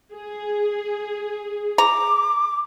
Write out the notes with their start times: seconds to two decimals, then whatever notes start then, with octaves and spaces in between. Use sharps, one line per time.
0.12 G#4
1.78 A#5 D6